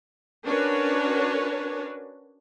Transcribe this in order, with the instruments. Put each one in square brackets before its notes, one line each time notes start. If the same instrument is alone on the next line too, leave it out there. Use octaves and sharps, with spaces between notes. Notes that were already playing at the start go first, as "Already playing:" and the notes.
[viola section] C#4 D4 F#4 A#4 B4 C#5